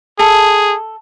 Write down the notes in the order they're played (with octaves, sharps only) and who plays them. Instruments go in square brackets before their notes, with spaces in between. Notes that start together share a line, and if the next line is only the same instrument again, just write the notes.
[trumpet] G#4 [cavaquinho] A4